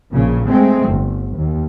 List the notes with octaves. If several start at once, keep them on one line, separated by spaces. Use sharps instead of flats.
A#1 A#2 C#3
G#3 A3 C4
G1
D#2